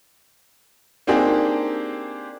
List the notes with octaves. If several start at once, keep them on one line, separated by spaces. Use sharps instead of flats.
A#3 C4 D4 D#4 G4 G#4